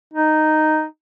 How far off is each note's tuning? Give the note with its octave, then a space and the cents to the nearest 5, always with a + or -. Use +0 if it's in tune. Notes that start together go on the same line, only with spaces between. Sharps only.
D#4 -5